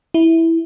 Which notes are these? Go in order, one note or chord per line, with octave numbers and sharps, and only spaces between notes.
E4